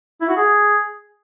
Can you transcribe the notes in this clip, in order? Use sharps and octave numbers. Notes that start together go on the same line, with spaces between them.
E4
F#4
G#4